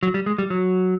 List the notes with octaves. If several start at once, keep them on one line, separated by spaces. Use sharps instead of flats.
F#3
G3
G#3
G3
F#3